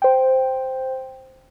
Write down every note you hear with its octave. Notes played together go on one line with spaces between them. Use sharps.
C5 G5